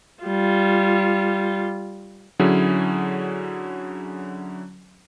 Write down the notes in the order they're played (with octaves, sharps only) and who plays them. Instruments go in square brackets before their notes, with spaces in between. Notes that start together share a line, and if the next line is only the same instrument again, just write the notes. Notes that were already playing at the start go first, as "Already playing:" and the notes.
[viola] G3 F4
[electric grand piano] D3 F#3 C#4 E4 G#4